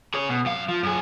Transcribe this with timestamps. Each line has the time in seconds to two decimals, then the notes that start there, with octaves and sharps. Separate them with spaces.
0.14 G#4 C#5
0.29 B2
0.46 F#2 F5
0.69 F3
0.83 F#2 G#4